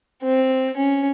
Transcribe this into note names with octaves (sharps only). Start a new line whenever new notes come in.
C4
C#4